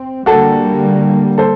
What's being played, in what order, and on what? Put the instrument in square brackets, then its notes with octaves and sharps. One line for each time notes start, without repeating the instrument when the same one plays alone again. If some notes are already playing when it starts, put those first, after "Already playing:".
Already playing: [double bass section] C4
[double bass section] D3 G3 A#3 [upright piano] F#4 A4
[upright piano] A4 C5